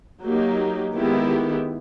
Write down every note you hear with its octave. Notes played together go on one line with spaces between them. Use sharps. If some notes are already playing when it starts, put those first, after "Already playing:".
F#3 A#3 D#4 G4
D#3 G#3 B3 E4 G4